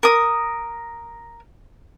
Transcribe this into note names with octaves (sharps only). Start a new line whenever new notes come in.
A#4 D#6